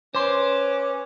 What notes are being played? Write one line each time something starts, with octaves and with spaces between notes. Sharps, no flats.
C#4 B4 C5 C6 D6